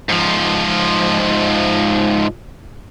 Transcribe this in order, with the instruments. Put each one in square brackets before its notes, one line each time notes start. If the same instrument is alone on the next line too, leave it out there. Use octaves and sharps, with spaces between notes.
[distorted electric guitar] G#2 F3